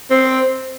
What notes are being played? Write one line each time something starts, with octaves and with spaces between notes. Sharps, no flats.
C4